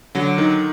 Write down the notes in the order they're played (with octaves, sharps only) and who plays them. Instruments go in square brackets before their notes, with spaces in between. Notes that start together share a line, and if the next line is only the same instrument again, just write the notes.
[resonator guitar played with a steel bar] D3 [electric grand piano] F#3
[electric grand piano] D#3